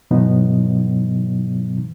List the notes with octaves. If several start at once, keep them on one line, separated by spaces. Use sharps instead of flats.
G2 B2 E3 F#3 B3 D#4